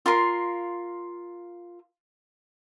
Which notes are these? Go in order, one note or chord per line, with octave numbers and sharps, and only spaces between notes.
F4 A#4 C6